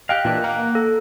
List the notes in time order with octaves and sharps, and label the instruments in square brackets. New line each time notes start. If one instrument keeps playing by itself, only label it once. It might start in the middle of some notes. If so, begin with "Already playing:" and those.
[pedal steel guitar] G4 F5 [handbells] D#5 G5 F#6
[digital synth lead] A#2 [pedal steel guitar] E3 D4 G4
[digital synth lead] A#3 [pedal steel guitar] F#5
[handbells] A4